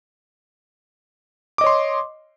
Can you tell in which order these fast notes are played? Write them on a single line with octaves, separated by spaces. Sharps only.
D6 D#5 C#5 C6